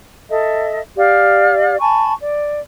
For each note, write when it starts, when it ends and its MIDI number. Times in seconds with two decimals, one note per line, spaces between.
0.30 0.79 69
0.30 0.79 75
0.30 0.79 76
0.97 1.78 67
0.97 1.78 74
0.97 1.78 77
1.80 2.13 80
1.80 2.13 81
1.80 2.13 83
1.80 2.13 85
2.20 2.60 74